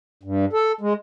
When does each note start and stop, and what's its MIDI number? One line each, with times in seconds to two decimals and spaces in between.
0.23 0.45 43
0.53 0.72 69
0.81 0.93 56